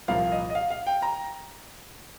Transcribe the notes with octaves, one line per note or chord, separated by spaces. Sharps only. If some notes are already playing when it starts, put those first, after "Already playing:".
C2 A#2 F3 A#3 F5
D#5
D#5
F5
F5
G5
A#5